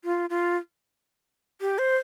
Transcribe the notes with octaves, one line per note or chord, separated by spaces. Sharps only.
F4
F4
G4
C5